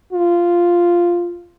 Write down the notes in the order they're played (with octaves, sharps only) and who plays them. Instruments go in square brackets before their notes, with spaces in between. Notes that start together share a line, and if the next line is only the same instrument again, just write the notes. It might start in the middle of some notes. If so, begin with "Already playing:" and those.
[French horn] F4